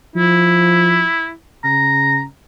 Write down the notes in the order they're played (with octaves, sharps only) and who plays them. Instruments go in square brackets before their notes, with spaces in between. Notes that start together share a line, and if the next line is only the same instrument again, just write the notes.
[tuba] F3 [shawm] E4
[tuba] C#3 [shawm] A#5